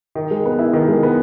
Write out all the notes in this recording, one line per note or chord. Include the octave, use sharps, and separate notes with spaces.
D#3
G#3
B3
E4
D#3
G#3
B3